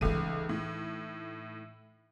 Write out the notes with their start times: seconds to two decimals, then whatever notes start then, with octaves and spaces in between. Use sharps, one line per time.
0.01 C#2 E3 A3 D#4 D#7
0.49 A2